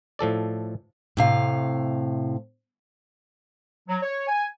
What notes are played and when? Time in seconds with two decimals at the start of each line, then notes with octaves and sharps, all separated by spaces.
0.19 A2 F3 A4 D5
1.17 A2 C3 F5
3.88 F#3
4.02 C#5
4.27 G#5